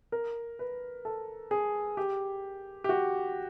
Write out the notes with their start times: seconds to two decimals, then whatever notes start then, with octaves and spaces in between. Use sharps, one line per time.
0.12 A#4
0.59 B4
1.05 A4
1.51 G#4
1.97 G4
2.84 G4
2.89 F#4